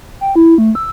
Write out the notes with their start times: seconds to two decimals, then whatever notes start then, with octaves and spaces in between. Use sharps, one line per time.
0.21 G5
0.36 E4
0.58 A3
0.75 E6